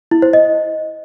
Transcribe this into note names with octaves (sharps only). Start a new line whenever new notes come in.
E4
C5
D#5